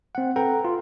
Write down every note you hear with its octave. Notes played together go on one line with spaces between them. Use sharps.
C4 F#5
A4 B4 F#5 G5 A#5
F4